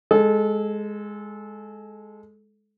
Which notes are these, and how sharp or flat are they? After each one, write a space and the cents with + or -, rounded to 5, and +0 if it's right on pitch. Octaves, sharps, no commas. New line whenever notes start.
G#3 +0 A4 -20